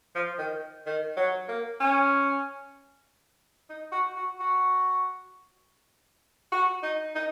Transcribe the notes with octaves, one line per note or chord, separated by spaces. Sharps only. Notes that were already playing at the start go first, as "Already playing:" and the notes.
F3
D#3
D#3
F#3
A#3
C#4
D#4
F#4
F#4
F#4
F#4
D#4
D#4